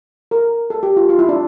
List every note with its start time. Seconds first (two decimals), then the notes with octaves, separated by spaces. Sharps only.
0.31 A#4
0.70 A4
0.83 G4
0.97 F4
1.09 F4
1.19 E4
1.29 D4